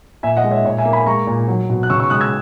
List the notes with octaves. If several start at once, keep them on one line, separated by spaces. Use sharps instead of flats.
A#2 E5 G#5
D#5 F#5
G#3
C#5 E5
A#2 C#5
E5 G#5
A#3
G#5 B5
G#3 A#5 C#6
A#2
F#3
B2
F#6
C#3 C#6 E6
C#6 E6
G#3 D#6 F#6
E6 G#6